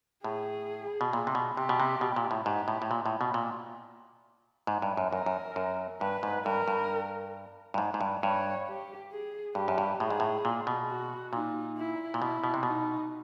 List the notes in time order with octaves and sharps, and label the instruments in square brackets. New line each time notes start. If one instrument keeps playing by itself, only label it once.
[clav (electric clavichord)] A2 [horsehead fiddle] G#4
[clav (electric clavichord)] B2
A#2
C3
B2
[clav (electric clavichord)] C3 [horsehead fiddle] G4
[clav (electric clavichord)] B2
C3
B2
A#2
A2
[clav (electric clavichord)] G#2 [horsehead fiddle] G4
[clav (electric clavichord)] A2
A2
A#2
A2
B2
A#2
G#2
G2
F#2
[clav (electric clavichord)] F#2 [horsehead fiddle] A#4
[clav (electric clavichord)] F#2
F#2
[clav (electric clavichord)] G2 [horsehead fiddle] B4
[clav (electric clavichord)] G#2
[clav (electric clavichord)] G2 [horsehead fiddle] A#4
[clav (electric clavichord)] G2
G2
G#2
G#2
G2
[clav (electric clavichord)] G2 [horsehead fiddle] C#5
[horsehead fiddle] G4
G#4
[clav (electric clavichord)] G2 [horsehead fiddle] G4
[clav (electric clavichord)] F#2
G2
[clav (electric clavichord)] A2 [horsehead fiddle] G#4
[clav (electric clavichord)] G#2
A2
A#2
B2
[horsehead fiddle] F#4
[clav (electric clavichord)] A#2 [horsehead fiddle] D#4
[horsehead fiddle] E4
[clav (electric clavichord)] A#2
[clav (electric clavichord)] B2 [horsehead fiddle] E4
[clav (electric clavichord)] B2
C3
[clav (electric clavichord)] B2 [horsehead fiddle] D#4